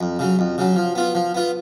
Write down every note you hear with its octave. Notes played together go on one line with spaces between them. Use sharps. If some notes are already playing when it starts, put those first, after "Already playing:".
F2
C#3 F#3
F2
C#3 F#3
F3
B3 F4
F3
B3 F4